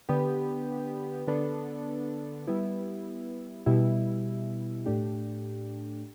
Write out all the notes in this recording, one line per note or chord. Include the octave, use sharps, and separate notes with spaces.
D3 B3 G4
D3 B3 D4 A4
G3 B3 E4
B2 G3 E4
A2 A3 D4 G4